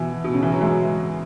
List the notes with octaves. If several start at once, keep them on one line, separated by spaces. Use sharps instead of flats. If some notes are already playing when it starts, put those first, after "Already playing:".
Already playing: B2 E3
B2
C#3
E3
F#3
E3 G#3